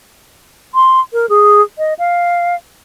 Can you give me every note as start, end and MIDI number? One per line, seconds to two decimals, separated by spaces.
0.75 1.00 84
1.13 1.26 70
1.29 1.62 68
1.78 1.94 75
1.99 2.55 77